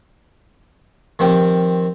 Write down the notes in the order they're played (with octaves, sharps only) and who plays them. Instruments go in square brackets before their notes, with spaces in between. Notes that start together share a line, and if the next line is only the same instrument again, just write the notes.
[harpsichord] D#3 F3 C4 G4 G5